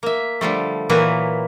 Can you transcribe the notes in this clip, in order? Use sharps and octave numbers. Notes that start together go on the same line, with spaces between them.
A#3 E5
D3 F3 G3 A3
A#2 E3 F#3 A#3 B4